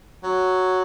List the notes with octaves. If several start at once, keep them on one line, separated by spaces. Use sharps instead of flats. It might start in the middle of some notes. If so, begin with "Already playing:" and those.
F#3